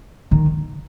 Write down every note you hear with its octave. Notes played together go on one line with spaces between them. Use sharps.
D#3